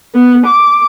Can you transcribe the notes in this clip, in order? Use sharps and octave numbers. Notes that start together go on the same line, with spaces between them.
B3
D6